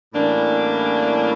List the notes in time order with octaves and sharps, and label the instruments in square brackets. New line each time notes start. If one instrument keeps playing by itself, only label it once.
[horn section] A2 E3 G3 A#3 C#4 D4